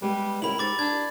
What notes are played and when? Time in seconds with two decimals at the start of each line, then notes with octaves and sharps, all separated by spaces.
0.02 G3 G#3 B3 G4
0.42 C#2 E4 G4 A#4 B5 F#7
0.58 G#2 B5 D6 A6
0.79 D4 G#6